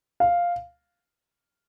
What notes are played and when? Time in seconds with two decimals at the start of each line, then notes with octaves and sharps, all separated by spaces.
0.20 F5